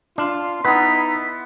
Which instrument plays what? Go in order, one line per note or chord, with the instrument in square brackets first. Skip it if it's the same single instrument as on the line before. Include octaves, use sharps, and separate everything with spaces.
[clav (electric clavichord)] D4 [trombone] F4 [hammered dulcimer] F5
[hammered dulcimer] B3 E4 C6 [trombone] D#4 [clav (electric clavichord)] B4 [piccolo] B6